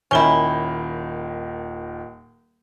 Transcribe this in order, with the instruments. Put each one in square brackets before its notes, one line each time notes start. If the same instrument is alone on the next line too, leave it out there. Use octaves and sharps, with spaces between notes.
[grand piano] D#1 D#3 G7 [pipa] C#4 E4